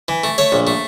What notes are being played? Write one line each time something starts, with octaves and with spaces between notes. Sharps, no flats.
E3
A3
A3 C#5
A#1
A3